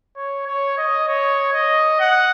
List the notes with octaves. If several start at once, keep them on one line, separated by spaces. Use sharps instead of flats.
C#5
C#5
D#5
C#5
D#5
F#5